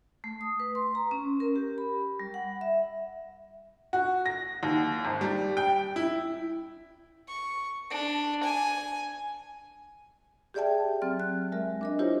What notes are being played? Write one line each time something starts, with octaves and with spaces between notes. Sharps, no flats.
A3
D#6
B4
C6
A#5
C#4
A#4
G4
B5
G3
F#5
E5
F#4
A#6
D#2
G#1
G3
G5
E4
C#6
D4
G#5
G4 G#4 D5 E5 G5 A5
F#3 C4 F6
F#6
G#3 A#4 E5
D4 A#4 D#5
E4 F4 G4 C5 C#5 D#5